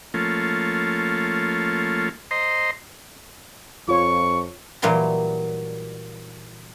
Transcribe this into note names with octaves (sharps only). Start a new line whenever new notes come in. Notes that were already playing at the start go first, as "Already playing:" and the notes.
F3 A3 A#3 C#4 F4
C5 D#5 A#5 C6
F2 F4 C#5 C#6
A#2 E3 F#3 G3 C6